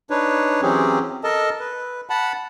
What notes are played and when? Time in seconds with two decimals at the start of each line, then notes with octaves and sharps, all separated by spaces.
0.10 D4 D#4 B4 C#5
0.62 E3 F#3 C4 C#4 G4 G#4
1.24 A4 A#4 D#5 A5
1.60 B4
2.10 F#5 A5 B5